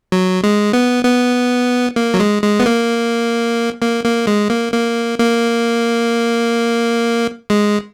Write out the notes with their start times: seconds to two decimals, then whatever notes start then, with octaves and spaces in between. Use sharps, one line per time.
0.12 F#3
0.44 G#3
0.73 B3
1.05 B3
1.96 A#3
2.14 F#3
2.20 G#3
2.43 G#3
2.59 B3
2.66 A#3
3.82 A#3
4.04 A#3
4.27 G#3
4.50 A#3
4.73 A#3
5.19 A#3
7.50 G#3